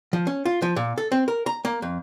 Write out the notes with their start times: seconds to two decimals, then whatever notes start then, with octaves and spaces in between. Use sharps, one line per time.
0.13 F3
0.27 C#4
0.45 F4
0.62 F3
0.76 A#2
0.98 A4
1.12 C4
1.28 A#4
1.46 A#5
1.65 A#3
1.82 F2